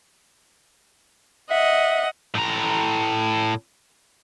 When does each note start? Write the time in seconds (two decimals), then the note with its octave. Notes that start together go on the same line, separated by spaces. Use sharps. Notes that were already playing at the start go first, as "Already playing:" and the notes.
1.51 D#5 E5 F#5
2.35 A2 A#5